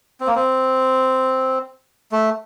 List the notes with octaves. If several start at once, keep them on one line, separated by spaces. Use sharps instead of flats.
C4
A#3
C4
A3